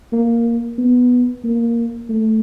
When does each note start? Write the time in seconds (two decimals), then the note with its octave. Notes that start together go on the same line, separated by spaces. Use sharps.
0.12 A#3
0.78 B3
1.44 A#3
2.09 A3